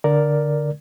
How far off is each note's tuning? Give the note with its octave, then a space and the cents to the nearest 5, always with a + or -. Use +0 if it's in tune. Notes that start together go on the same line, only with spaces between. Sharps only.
D3 +0 A#4 +0 D5 +0